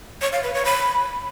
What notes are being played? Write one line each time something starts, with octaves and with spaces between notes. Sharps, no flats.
C#5
F5
B4
C#5
B5